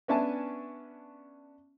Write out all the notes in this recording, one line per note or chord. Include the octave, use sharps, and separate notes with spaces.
B3 C#4 D4 E5 G#5 A5